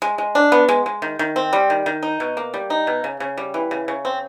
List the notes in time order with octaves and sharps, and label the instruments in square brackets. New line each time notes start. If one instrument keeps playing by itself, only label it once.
[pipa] G#3
G#3
D4
B3
G#3
G#3
D#3
D#3
C4
G3
D#3
D#3
D#4
B2
A#3
G3
D#4
B2
C#3
C#3
G3
E3
C#3
C#3
C4